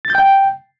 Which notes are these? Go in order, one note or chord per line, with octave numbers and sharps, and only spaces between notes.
A6
G6
G5